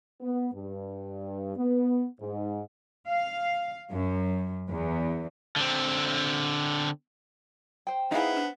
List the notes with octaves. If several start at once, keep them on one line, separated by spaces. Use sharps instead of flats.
B3
G2
B3
G#2
F5
F#2
E2
D3 C4
C5 G5
B3 D#4 E4 G#4 F5
D4